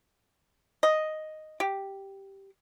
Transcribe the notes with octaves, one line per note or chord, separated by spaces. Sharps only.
D#5
G4